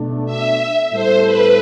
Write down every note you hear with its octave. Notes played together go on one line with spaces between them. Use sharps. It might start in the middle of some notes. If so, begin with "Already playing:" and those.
Already playing: B2 A3 D4
E5
A2 G3 B3 E4 A4 C5
B4